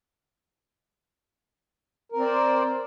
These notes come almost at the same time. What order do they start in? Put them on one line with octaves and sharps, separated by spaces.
A#4 C4 D5 C5